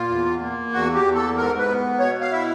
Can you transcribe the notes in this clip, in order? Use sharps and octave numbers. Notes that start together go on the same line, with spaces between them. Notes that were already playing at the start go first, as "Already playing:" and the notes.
Already playing: A#2 F4
E2
A#3
E2 F#4
G4
E2
A4
G#2 A#4
B4
B3
B2 C#5
F5
E4 E5